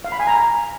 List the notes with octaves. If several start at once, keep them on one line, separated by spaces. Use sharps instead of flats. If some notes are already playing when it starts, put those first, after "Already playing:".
F5
B5
G#5
A#5